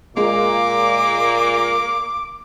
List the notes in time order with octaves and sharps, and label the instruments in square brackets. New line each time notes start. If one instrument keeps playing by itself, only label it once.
[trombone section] A#2 [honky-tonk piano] G#3 [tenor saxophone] A#3 [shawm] D6